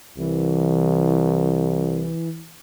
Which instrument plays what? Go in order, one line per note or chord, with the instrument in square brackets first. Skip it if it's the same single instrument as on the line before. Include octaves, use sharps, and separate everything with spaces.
[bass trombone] C2 [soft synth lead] E3